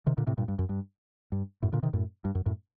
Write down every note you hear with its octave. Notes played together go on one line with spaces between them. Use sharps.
C3 D#3
A#2 D3
A2 C3
G2 A#2
G2
F#2
G2
G2
F#2 A2
A#2 D3
C3 D#3
F#2 A2
G2
F#2
F#2 A2